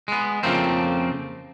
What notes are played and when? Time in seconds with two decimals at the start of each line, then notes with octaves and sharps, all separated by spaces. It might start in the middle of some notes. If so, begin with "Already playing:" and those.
0.08 G#3 B3
0.43 F2 C#3 F3 A3 A#3 C4